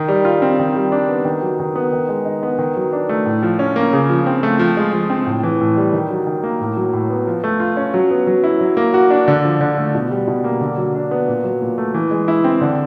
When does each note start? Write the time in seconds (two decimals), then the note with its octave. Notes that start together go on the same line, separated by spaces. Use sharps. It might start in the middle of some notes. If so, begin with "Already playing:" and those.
Already playing: D#3
0.08 G3
0.25 F4
0.42 C4
0.59 D#3
0.75 G3
0.92 D4
1.09 B3
1.25 D#3
1.42 F#3
1.60 D#3
1.76 B3
1.93 D#3
2.09 G#3
2.25 D#4
2.43 B3
2.59 D#3
2.77 F#3
2.93 D4
3.09 A3
3.26 A2
3.43 F3
3.59 C#4
3.76 A#3
3.93 C#3
4.09 F3
4.26 C4
4.43 A3
4.59 F3
4.77 G#3
4.93 F3
5.10 C4
5.26 A2
5.43 E3
5.61 A2
5.77 G3
5.93 D#3
6.10 F#3
6.27 D#3
6.44 A#3
6.60 A2
6.77 F#3
6.93 A2
7.10 B3
7.27 F3
7.44 A3
7.60 F4
7.77 C#4
7.94 F#3
8.11 B3
8.27 F#3
8.44 E4
8.61 F#3
8.77 A#3
8.94 F#4
9.10 D4
9.28 D3
9.45 F3
9.61 D3
9.78 A3
9.95 B2
10.11 G3
10.28 B2
10.44 A#3
10.61 D3
10.78 F#3
10.95 D4
11.11 B3
11.28 A#2
11.44 F#3
11.62 A#2
11.78 A3
11.94 E3
12.11 G#3
12.28 E4
12.44 C4
12.61 D3